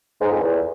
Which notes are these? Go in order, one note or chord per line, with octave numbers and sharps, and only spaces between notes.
G#2
F2
E2